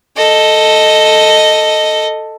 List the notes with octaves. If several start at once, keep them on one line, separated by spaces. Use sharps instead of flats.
A4 D#5